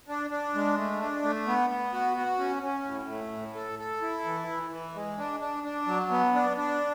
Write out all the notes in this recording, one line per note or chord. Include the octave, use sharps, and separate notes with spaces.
D4
D4
G#3
A3
D4
A3
B3
B3
F#4
F#4
C#4
C#4
A2
A3
A2
A4
A4
E4
E3
E3
E3
G#3
D4
D4
D4
F#3
B3
D4
D4